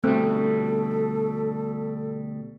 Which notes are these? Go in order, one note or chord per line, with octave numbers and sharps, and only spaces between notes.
D2 B2 G3 A3 C4 A4